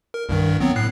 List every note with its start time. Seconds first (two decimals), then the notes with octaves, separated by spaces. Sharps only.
0.14 A#4
0.29 C2 G2 D#3
0.60 F#3 B3 C4
0.76 A2 F#6 C7